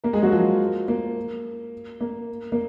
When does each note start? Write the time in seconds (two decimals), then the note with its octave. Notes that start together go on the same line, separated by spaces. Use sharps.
0.04 A#3 A#4
0.13 G#3 G#4
0.23 F#3 F#4
0.32 F3 F4
0.88 A#3
2.01 A#3
2.52 A#3